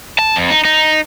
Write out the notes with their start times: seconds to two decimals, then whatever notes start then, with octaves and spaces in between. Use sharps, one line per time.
0.19 A5
0.36 F2
0.50 D#4
0.65 D#4